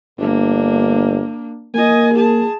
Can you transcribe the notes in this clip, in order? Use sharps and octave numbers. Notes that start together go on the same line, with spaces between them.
G1 A#3 D4
A#3 D#5 G#5
G#4 A5